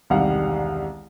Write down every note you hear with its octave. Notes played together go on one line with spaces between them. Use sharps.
E1 C2 D#3 G3 F5 F#5